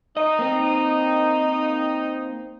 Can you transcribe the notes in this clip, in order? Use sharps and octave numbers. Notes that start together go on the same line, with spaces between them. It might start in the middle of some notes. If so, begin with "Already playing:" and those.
D#4 D#5
A#3 C4